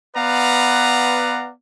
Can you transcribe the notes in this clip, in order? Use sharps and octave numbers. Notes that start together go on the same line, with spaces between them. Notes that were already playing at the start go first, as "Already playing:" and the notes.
B3 B4 D5 F5 F#5 A#5